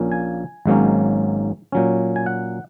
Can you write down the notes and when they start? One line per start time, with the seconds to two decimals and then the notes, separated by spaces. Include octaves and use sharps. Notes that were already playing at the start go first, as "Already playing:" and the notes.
Already playing: A#1 A#2 A#3 C#4
0.12 G#5
0.66 G#1 G#2 F#3 A#3 C#4
1.72 A#2 F#3 C#4
2.16 G#5
2.26 F#5